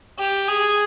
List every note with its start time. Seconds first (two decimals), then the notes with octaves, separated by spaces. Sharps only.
0.19 G4
0.48 G#4